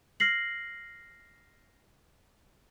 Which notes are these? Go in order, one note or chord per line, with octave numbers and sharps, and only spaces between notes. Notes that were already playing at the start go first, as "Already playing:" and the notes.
F6 A#6 C7 F#7